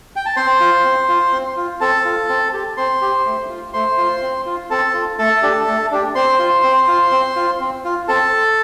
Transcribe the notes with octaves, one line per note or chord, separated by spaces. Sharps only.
G5
A5
C4 C5 C6
F4
C4
F4
C4
F4
C4 A4 A5
F4
C4
G4
C4 C5 C6
G4
A3
F4
A3 C5 C6
F4
C4
F4
C4 A4 A5
F4
A3 A4 A5
D4 G4
A3
D4 G4
C4 C5 C6
F4
C4
F4
C4
F4
C4
F4
C4 A4 A5